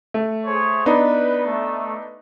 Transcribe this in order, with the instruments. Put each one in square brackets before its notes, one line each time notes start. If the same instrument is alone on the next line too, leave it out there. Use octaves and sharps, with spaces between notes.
[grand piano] A3
[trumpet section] G#4 C5 C#5
[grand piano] B3 D4 D#4 [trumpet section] B4
[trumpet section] A3